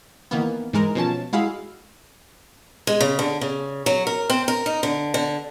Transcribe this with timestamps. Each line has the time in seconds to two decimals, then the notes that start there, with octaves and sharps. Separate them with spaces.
0.31 D#3 E3 A#3 B3
0.73 G#2 E3 G#3 A#4
0.95 B2 F3 C#4 A5
1.33 G#3 E4 F#4 G#4 F5
2.87 G#3
3.01 C#3
3.19 D3
3.41 C#3
3.86 F#3
4.07 A#4
4.30 C4
4.48 A#4
4.66 D#4
4.83 D3
5.14 D3